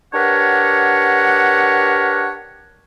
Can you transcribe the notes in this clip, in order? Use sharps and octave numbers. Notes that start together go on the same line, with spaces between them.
D4 G4 A#4 B4 C#5 F#5